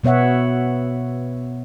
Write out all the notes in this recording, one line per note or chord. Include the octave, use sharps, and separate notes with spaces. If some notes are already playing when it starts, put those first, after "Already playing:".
B2 B3 C#5 E5 F#5